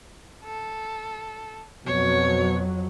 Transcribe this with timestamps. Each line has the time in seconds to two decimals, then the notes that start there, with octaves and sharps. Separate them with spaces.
0.44 A4
1.86 F2 B2 F#3 C#5